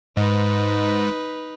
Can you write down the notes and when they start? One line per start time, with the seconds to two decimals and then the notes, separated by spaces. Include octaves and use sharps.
0.17 G#2 D#4 B4